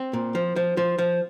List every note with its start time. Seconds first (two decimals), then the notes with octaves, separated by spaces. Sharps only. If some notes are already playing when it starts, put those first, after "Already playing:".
Already playing: C4
0.13 A#2
0.35 F3
0.56 F3
0.77 F3
0.98 F3